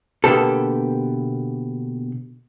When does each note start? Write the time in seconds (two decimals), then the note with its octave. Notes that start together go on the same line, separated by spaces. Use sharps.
0.24 B2 D3 A#3 B3 G4 A4